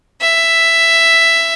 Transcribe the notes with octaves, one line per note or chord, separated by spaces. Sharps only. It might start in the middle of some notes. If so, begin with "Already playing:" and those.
E5